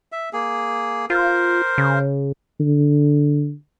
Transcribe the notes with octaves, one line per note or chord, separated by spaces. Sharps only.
E5
A#3 G#4
F4 A#4 C5
C#3
D3